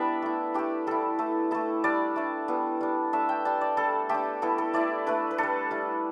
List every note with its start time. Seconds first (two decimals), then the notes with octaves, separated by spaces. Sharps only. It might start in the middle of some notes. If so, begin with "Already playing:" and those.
Already playing: G3 B3 D4 E4 D5 E5
0.22 A3 E4
0.54 A3 D4 G4
0.87 G3 E4 A4
1.19 A3 E4
1.51 A3 E4 A4
1.84 G3 D4 D5
2.16 A3 D4
2.48 G3 B3 E4
2.81 G3 D4
3.13 A3 D4 E5
3.29 G5
3.45 G3 D4 A5
3.61 D5
3.77 G3 D4 A4
4.09 A3 D4 G4
4.42 G3 B3 E4 A4
4.58 A4
4.74 A3 E4 D5
5.06 A3 D4 B4
5.31 B4
5.38 G3 D4 A4
5.71 G3 E4